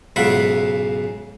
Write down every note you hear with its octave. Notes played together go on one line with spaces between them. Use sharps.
B1 G#2 C#3 F4 E5 F#5